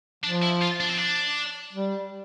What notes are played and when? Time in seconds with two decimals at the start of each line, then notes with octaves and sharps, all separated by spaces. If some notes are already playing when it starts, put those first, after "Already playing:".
0.24 F3 D4
0.42 E4
0.62 F4
0.80 D4
0.89 C4
0.97 D4
1.73 G3